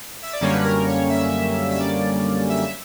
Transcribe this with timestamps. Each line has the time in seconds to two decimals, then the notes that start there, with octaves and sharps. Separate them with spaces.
0.23 E5
0.33 D5
0.40 F#2 D3 G3 A#3 C#4 C#5
0.54 B4
0.64 A#4
0.86 C#5
1.09 E5
1.71 E5
1.80 D5
2.50 E5